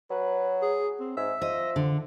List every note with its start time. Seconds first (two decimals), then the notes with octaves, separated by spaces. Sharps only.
0.11 F#3 B4
0.62 G#4
1.00 C4
1.17 G#2 E5
1.42 F3 D#5
1.76 D3